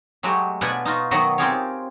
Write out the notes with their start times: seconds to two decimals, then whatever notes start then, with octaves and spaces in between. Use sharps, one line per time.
0.23 F#3 G#3 A3 F#4 G4
0.61 B2 D4 F4 B4 F#5 G#5
0.85 D#4 F4 F#4
1.11 D#3 F#3 B3 F#4 D#5 F#5
1.38 C4 F4 G4 G#4 A#4 C#5